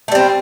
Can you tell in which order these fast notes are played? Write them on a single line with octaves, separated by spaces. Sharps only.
A3 G3 C4